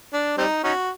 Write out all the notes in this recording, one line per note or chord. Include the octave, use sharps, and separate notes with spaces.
D4
G3 C4 D#4
C#4 D#4 F#4